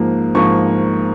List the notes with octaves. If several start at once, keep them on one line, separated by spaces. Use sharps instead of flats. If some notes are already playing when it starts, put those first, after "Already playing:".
Already playing: G#2 F3 A#3
G#2 F3 A#3 C#6